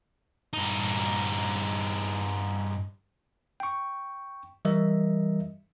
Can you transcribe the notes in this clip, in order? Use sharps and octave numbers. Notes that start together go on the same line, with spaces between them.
G2 D#4
G5 C#6
E3 G3 A#4 D#5 E5